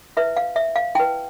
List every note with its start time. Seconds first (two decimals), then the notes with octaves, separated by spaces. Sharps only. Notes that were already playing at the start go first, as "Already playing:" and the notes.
0.17 E4 B4 E5
0.37 F5
0.56 E5
0.76 F5
0.95 E4 B4 G5